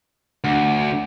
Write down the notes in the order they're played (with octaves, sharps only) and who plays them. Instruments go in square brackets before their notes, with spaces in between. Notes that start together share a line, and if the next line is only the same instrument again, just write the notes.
[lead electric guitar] D2 [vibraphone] D4 F#5